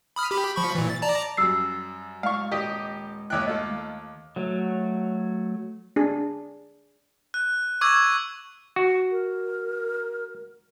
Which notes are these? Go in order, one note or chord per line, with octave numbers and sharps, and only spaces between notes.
B5 D#6 F6
G4 B5
F3 B5 C#6
A#2 E3
A6
D5 A5 A#5
F#2 G3 E6 C7
G#3 F5 C#6
D#1 G4 D#5
D#2 C#5 E5 G5 F#6
A3 F4 A4 D#5
F#3 A3
D4 G#4
F#6
C#6 D6 E6 G#6
F#4
A#4